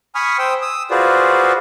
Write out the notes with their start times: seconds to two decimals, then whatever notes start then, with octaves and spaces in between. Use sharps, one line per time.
0.15 G#5 B5 C#6 D#6 F6
0.39 C5 G5 D#6 E6
0.62 D#6 E6
0.91 F4 F#4 G#4 B4 C5 D5